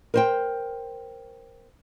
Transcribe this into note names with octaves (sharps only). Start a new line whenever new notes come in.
A#4 C5 G5